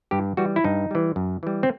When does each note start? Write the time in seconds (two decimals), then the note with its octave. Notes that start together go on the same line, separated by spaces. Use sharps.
0.11 G2 G4
0.37 E3 G3 F#4
0.56 E4
0.64 G2 D#4
0.91 E3 G3
1.16 F#2
1.43 E3 G3
1.63 C4